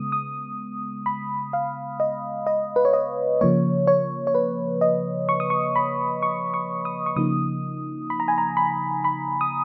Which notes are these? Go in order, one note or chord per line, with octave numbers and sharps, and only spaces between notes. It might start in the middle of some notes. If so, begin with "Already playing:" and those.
Already playing: C#3 G#3 B3 D#6
D#6
B5
F5
D#5
D#5
B4
C#5
D#5
C#3 F3 A#3 C#5
C#5
C#5
B4
D#5
C#6
D#6
C#6
B5
C#6
C#6
D#6
C#6
C#3 F3 A#3 D#4 D#6
B5
A#5
G#5
A#5
B5
B5
D#6